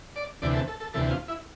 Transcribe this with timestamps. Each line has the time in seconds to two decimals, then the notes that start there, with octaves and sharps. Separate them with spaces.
0.16 D5
0.42 D2 C3 E3 D5
0.55 A4
0.68 A4
0.80 A4
0.94 D2 C3 E3 A4
1.10 F4
1.28 E4